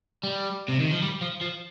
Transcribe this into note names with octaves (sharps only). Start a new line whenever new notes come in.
G3
C3
D#3
F3
G3
F3
F3